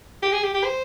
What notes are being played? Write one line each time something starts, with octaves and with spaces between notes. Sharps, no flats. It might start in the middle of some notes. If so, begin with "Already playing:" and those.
G4
G#4
G4
G4
C5